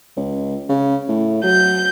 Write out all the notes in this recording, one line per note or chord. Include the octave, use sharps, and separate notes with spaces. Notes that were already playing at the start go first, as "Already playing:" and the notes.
C#2
C#3
A2
F#3 G6